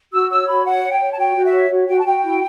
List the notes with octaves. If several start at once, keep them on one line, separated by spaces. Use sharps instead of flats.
F#4 E6
C#5 E6
F#4 B5
C#5 F#5
C#5
G5
C#5
A5
F#4 G5
F#4
E5
C#5
F#4
F#4 G5
A5
F#4 G5
E4